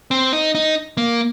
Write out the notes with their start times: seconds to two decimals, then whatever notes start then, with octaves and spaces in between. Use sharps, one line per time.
0.11 C4
0.33 D#4
0.55 D#4
0.97 A#3